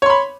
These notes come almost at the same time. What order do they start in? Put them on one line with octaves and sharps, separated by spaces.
C#5 C6 B5